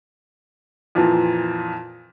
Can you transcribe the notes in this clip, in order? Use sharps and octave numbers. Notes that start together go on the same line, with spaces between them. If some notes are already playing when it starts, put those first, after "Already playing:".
F2 A#2 E3